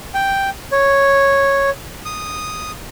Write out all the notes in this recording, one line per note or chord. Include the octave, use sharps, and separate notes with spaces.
G5
C#5
D#6